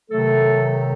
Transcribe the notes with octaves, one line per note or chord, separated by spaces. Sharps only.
C3 D#3 F#3 A3 A4